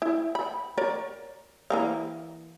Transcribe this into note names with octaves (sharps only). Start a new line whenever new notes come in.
E4
B5
A#4 C#5 D5
E3 A#3 F5